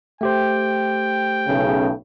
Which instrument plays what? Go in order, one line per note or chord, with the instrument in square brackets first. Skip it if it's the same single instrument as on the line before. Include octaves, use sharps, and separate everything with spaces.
[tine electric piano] A3 G4 C5 [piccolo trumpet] G5
[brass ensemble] B1 A2 C#3